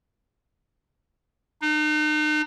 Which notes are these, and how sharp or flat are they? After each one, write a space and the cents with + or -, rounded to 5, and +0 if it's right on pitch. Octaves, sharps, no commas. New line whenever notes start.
D#4 -40